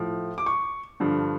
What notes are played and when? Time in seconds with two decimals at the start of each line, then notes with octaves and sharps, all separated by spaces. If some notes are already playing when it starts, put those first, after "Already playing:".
Already playing: A2 F3
0.38 D6
0.46 C#6
1.00 G2 D3 F3